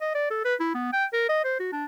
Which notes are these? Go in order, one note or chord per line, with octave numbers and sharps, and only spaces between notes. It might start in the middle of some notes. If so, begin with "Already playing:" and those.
D#5
D5
A4
B4
E4
B3
G5
A#4
D#5
C5
F#4
D4